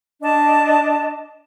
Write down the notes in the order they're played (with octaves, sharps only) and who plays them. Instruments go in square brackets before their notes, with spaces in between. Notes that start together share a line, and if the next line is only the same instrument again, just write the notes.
[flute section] D4 D#5 A5